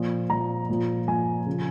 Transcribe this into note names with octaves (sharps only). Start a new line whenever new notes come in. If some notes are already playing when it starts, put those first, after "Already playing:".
Already playing: A#2 F3
A#2 F3 A#5
A#2 F3
A#2 F3 G#5
C#3 F3